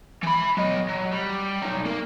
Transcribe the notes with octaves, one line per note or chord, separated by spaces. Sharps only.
E3 B5
F#3 D#5
F#3
G3
F#3 D#4
A#3 A#4